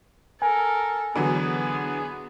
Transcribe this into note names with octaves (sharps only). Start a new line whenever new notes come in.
A4 A#4 G#5
D3 E3 F#3 B3 G#4